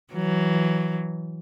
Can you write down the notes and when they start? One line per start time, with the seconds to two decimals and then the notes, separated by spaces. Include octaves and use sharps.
0.14 E3 F#3